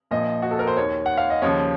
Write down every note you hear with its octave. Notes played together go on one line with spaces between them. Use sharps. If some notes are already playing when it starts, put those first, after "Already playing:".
A#1 A#2 F3 D#5
F#4
A4
A#4
C5
D#2 D#3 C#5
F#5
F5
D#5
D#2 C#3 F3 C#5